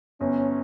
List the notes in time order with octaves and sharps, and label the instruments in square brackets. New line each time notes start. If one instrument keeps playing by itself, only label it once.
[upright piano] G1 [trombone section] C#4